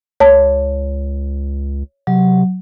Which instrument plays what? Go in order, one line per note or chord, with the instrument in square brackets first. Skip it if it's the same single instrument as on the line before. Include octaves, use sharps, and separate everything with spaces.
[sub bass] C#2 [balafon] C#5 A5
[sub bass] C3 [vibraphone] F#3